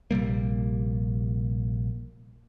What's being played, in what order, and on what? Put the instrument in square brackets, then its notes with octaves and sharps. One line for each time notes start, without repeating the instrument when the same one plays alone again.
[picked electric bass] A#1 C3 G3 A#3